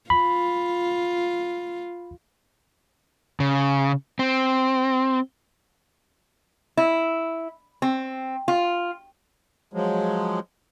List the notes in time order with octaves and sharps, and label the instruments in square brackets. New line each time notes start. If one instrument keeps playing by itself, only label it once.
[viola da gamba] F4 [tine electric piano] B5
[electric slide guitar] C#3
C4
[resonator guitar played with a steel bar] E4
C4
F4
[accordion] F3 F#3 G#3